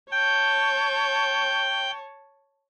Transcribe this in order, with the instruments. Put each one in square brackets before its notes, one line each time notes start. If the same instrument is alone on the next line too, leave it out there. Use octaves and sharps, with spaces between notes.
[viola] C#5 A5 [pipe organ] G5 G6